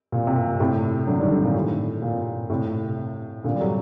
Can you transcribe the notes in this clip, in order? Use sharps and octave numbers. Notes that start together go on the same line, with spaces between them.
A#2
C3
A#2
A2 C3
D3 F#3
D#3 G3
D3 F#3
A#2
A2
A#2
A2 C3
A#2 D3
G3
D3 F#3